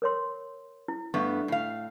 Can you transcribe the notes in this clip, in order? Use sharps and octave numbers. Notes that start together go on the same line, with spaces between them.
A#4 C#5 C6
E4
G2 A3 B3 C#6
A2 F5